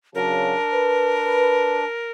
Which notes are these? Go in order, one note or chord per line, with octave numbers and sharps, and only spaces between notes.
C#3 F#3 D4 A#4
B4